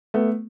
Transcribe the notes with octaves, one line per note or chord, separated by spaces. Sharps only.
A3 B3